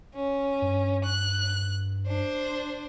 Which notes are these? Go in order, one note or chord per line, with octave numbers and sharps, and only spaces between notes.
C#4
G2
F#6
D4 C5